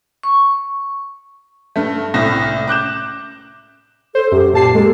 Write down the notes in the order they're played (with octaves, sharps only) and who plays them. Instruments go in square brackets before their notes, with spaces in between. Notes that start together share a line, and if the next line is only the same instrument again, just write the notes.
[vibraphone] C#6
[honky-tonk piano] G2 A3
C2 A2 E5 A#6
D6 F#6 G6 E7
[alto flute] A4 [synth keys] C5
[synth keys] F#2 [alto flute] G4
[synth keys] A#2 A5 C7 [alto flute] G4
[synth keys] G#3 A#3 [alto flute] A4